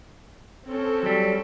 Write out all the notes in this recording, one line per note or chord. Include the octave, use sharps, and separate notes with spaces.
C4 C#4 A4
F#3 G3